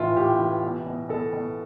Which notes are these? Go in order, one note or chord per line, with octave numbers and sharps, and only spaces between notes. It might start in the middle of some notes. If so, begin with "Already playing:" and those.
Already playing: A2 E3 E4 F4
A2 G4
E3
B2
B2
B2 A4
B2